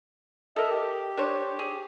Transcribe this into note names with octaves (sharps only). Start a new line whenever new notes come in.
A4 A#4 D#5 E5
G4
D4 C5 C#5
G#4